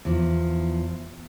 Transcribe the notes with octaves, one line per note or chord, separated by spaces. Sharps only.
E2 F3